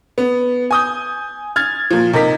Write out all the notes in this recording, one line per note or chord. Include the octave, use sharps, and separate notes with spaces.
B3
G#5 D#6 G6
F6 G#6 A6
A#2 F3
C3 D#4 A#4 B6